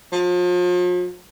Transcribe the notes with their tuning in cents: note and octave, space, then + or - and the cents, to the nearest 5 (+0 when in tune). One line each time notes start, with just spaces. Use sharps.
F3 +40